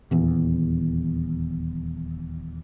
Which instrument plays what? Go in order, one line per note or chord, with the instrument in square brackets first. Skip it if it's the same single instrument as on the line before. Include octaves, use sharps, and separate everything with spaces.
[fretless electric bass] D#1 E2